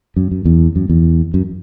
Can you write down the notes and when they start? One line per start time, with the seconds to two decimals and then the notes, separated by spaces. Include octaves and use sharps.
0.16 F#2
0.31 F#2
0.45 E2
0.76 F#2
0.89 E2
1.34 F#2